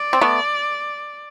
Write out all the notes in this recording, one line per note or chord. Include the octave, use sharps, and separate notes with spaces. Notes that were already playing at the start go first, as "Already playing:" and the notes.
Already playing: D5
C4
A3 B3